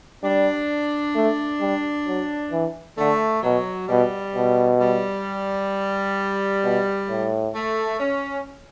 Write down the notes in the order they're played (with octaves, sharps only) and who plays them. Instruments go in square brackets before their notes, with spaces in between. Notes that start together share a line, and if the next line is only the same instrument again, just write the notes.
[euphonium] G3 [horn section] D4
[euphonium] A3
G3
F#3
E3
[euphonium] D3 [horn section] A3
[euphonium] B2 [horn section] F#3
[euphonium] B2 [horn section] G3
[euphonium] B2
[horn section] G3
[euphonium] B2
A2
[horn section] A3
C#4